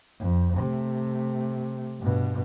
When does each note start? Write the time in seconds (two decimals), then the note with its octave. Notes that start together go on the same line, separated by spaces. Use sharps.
0.19 F2
0.58 C3 A3
2.00 G2 B2